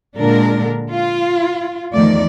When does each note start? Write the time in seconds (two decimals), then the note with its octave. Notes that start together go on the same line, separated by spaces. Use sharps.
0.17 A#2 D3 G#3 D4 A#4
0.90 F4
1.93 E2 D#3 F3 A3 D5